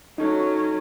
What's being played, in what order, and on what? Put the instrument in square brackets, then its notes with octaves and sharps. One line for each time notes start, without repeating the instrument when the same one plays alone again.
[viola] F#3 C#4 [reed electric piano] D#4 A4